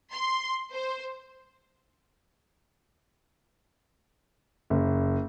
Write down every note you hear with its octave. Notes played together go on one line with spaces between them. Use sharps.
C6
C5
F#1